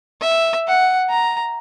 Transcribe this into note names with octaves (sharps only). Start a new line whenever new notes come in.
E5
F#5
A#5